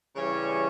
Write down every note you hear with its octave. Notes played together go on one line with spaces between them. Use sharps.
C#3 E3 G3 C#4 C#5